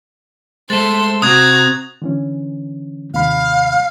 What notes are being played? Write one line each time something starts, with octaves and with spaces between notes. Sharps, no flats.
G#3 A3 A4 C5 C6 A6
C3 C4 F#4 A#5 D#6 F#6 G#6
D3 E3 C#4
D#2 C3 F5 B5